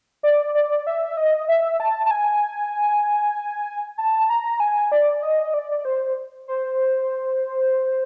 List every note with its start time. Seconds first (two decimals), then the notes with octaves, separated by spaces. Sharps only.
0.23 D5
0.55 D5
0.87 E5
1.17 D#5
1.49 E5
1.80 A5
2.06 A5
2.11 G#5
3.98 A5
4.29 A#5
4.60 G#5
4.92 D5
5.23 D#5
5.54 D5
5.85 C5
6.48 C5